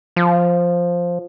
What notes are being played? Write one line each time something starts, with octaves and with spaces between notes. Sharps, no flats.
F3